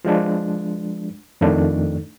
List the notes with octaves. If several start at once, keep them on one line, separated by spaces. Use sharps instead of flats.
F3 G#3 D4
F2 D#3 A3 D4